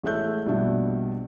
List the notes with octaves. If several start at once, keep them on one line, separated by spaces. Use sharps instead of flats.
A1 G#3 A3 E5 F#6 G6
A#1 G2 B2 D4 E5